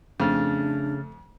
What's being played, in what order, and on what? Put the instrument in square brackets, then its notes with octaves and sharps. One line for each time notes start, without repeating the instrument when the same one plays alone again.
[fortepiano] F2 [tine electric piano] C#3 F6 A6 [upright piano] A3 [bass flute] D4